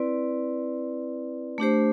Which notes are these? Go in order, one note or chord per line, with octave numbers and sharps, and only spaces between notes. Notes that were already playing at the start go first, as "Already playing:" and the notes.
Already playing: C4 E4 B4 D5
A3 D4 G4 C5